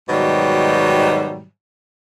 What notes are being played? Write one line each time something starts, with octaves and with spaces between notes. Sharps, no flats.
G#2 B2 D#3 F#3 G3